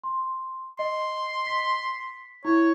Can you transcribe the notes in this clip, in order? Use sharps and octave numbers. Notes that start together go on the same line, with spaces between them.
C6
D#5 C6
B6
E4 C#5